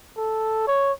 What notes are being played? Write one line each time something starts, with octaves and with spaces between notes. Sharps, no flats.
A4
C#5